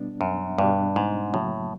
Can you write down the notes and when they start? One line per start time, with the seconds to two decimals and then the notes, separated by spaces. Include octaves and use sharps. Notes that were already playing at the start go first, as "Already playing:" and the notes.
Already playing: B2 G3 B3 D4
0.21 F#2
0.58 G2 B2 G3 B3 D4
0.96 G#2
1.34 F#2 A2 C#3 F#3 A#3